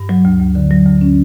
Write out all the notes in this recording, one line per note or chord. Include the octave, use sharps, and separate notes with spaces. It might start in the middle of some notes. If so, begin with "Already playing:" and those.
Already playing: G2
F#3
D2
D2
D3
F#3
D2
C#4